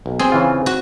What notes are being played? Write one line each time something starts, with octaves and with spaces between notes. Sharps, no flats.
B1
C4 G#4
C#3 E3 F4
F#4